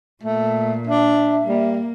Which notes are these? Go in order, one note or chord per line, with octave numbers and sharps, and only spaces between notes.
A#2 A3
D4 E5
G3 A#3